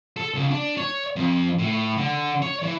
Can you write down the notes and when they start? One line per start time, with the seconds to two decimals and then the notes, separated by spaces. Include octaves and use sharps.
0.17 A4
0.34 C#2
0.51 D4
0.77 C#5
1.16 F2
1.58 A2
1.97 D3
2.42 C#5
2.63 E3